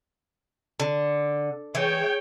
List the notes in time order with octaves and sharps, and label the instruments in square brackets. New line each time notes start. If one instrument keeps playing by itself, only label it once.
[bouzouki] D3
[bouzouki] E3 [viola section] G#4 C#5 G5